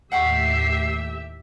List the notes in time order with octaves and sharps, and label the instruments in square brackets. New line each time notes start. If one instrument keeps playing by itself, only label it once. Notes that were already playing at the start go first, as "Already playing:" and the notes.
[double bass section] D#2 A2 [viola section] G4 E5 [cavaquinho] F#5 G5 C#6 [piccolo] C7